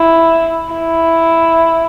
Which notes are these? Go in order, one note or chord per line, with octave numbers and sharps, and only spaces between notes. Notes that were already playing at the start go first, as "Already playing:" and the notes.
Already playing: E4
E4